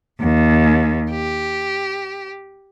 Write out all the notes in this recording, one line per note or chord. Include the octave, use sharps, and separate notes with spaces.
D#2
G4